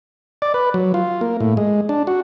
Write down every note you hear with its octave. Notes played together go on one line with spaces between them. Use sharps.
D5
B4
F#3
F4
A#3
A2
G#3
D4
F#4